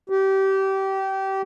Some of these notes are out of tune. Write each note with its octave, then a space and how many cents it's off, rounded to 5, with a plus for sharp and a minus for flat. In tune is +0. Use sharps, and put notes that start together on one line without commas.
G4 -25